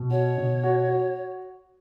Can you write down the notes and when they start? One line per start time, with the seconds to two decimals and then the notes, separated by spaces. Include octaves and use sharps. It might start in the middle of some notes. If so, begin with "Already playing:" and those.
Already playing: B2
0.10 F#4 C#5
0.38 B2
0.63 F#4
0.88 F#4